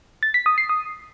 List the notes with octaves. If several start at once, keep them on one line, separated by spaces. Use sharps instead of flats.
A6
B6
D#6
C7
D#6